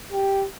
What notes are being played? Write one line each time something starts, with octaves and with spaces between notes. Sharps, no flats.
G4